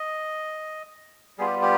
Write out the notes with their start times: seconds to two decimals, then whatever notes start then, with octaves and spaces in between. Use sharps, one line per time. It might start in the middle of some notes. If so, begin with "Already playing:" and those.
Already playing: D#5
1.38 G3 B3 F4 G#4
1.47 G4
1.62 G4